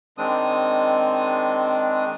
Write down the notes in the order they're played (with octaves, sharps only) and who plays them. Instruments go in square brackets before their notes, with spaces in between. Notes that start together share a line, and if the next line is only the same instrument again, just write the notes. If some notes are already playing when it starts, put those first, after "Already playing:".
[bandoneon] D#3 G#3 C4 D4 D#6